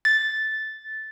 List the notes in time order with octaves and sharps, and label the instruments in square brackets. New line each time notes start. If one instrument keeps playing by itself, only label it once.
[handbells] A6